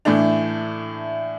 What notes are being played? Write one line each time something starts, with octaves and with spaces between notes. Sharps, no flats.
A2 E3 A3 D4